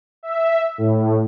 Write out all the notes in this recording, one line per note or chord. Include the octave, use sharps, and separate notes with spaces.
E5
A2